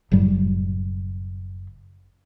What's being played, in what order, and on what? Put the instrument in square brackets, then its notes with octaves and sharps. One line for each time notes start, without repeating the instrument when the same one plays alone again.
[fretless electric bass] F#1 A2 F#3 G3